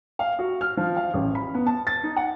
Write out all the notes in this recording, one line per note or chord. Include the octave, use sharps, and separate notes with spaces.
F5
F#4
F6
F3
F5
A1
B5
B3
A5
A6
D#4
F#5